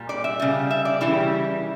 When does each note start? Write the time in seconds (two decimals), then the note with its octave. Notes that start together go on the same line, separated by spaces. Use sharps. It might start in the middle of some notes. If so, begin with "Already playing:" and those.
Already playing: A#2 G3
0.09 D5
0.24 E5
0.39 C#3 G3
0.70 E5
0.85 D5
1.01 C#3 E3 G3 E4